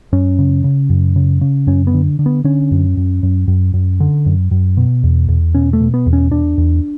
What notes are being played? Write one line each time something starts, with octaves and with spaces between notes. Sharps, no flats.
F#2 C#4
C#3
C#3
F#2
C#3
C#3
F#2 C#4
B3
D3
D3
B3
D3 C#4
F#2
F#2
F#2
F#2
F#2
D3
F#2
F#2
B2
E2
E2
B2 C#4
A3
B2
B3
E2
C#4
E2 D4
E2